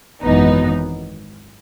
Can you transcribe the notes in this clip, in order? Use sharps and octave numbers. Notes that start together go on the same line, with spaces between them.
G#1 F#2 E3 B3 D#4